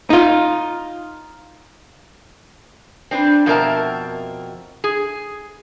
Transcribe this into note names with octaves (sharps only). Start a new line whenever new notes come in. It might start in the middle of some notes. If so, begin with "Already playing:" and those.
D#4 F4
C4 D4 G#4 B4
F2 B2 C4 A#4 E5 A5
G#4